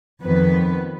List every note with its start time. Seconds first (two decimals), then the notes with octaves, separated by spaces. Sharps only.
0.23 F2 D#3 B3 B4